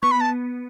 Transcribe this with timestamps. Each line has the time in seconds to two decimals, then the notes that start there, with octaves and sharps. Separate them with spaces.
0.02 B3 C#6
0.11 B5
0.21 A5